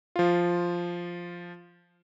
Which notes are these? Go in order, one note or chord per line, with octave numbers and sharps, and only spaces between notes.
F3 F4